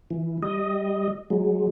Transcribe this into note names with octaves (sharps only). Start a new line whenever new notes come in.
E3
G3 D#5
F#3 G#3